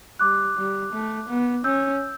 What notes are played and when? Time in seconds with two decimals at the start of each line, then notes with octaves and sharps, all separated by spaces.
0.19 G3 D6 F#6
0.57 G3
0.92 A3
1.28 B3
1.64 C#4 E6 G6